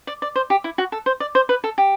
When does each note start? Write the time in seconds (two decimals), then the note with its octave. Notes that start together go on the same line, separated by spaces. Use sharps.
0.07 D5
0.22 D5
0.36 C5
0.50 G4
0.64 E4
0.78 F#4
0.92 A4
1.06 C5
1.20 D5
1.35 C5
1.49 B4
1.64 A4
1.78 G4